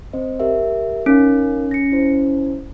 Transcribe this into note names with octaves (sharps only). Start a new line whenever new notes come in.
C4 C5 D#5
G4 A#4 E5
C#4 D#4 A#4 F5
A#6 C#7
E4 C5